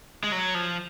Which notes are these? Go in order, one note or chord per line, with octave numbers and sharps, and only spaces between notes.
G#3
F#3
F3